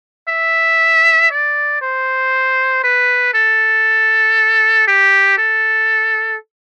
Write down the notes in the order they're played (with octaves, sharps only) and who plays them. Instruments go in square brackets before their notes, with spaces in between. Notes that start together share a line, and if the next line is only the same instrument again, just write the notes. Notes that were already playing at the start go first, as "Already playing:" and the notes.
[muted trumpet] E5
D5
C5
B4
A4
G4
A4